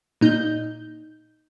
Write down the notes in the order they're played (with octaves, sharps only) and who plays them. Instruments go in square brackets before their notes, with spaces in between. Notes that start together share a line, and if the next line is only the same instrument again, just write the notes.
[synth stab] A#2 D#4 G6